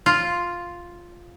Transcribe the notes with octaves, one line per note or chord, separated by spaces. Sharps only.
F4